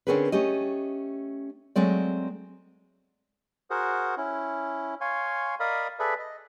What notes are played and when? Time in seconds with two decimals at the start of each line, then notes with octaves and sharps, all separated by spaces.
0.07 D3 C4 C#4 G#4 A#4 B4
0.32 A3 C#4 G4 D#5
1.76 F#3 G#3 A3 C4 D5
3.70 F#4 G#4 A#4 C5 F#5
4.17 C#4 E4
5.01 C#5 F5 G#5 C6 C#6
5.60 A#4 D5 D#5 F5 B5 D#6
5.99 G#4 A4 B4 D5 E5 B5
6.19 D#5